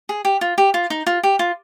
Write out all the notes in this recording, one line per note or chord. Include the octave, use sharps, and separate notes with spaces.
G#4
G4
F4
G4
F4
D#4
F4
G4
F4